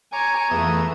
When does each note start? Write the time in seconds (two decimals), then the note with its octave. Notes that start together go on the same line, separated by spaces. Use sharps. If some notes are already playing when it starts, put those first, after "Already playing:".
0.13 C#5 G#5 A#5 D6
0.51 F2 E3 A3 B3 G#4 E5 D#6